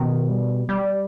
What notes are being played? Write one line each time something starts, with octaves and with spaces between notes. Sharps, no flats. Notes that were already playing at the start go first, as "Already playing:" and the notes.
Already playing: B2 D#3
G3
G3